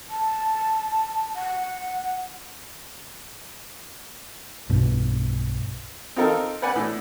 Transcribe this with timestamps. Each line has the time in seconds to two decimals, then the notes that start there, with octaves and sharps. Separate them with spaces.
0.10 A5
1.35 F#5
4.70 B1 G2 B2
6.16 C4 D#4 F4 A4 A#4
6.62 B4 D5 F#5 G#5
6.76 A2